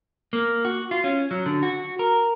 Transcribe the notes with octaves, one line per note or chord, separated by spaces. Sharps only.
A#3
F#4
F4
C#4
F#3
D3
F#4
A#4